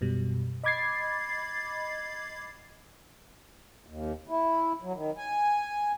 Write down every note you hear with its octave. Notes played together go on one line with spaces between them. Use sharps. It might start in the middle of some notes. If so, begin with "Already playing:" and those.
F#2 B2 G3
D#5 B5 D6 G#6 A6 C7
D#2
E4
F#3
D#3
G#5